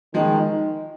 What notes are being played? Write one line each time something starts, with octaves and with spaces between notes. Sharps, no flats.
D#3 F3 G#3